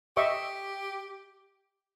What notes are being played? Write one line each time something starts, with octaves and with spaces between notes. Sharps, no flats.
G4 D#5 E5 C#6